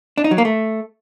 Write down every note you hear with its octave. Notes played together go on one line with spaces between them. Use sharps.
D4
D#4
F#3
A#3
A3